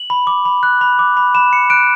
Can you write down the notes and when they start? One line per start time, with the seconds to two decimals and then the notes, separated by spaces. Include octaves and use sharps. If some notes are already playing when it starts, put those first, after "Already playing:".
Already playing: F#7
0.10 B5
0.27 D6
0.45 B5
0.63 F#6
0.81 B5
0.99 D6
1.17 B5
1.35 B5 E7
1.52 B5 C#7
1.70 F#6 D7